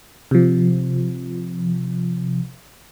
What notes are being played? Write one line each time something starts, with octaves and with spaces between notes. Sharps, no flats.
C3 F3